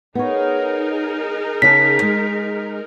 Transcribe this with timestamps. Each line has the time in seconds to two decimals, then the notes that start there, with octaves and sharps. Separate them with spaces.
0.15 B3 D#4 G#4 A#4 C#5
1.62 C#3 D#5 A5 B6
2.02 G#3